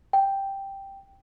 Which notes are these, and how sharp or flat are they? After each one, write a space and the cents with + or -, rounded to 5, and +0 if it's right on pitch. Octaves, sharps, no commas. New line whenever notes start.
G5 +0